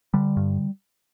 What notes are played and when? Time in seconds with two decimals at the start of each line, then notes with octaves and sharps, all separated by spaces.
0.14 D3 G3
0.37 G2